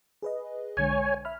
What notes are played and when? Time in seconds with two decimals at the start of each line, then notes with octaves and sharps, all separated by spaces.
0.22 G#4 B4 D#5
0.77 B1 D3 G#3 C#5 G#5
1.25 E5 B5 F6